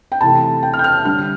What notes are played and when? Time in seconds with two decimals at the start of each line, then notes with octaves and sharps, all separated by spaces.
0.12 G5
0.21 C3 E3 A3 A5
0.63 G5
0.73 F6
0.79 G6
0.84 F6
1.05 D3 G3 F6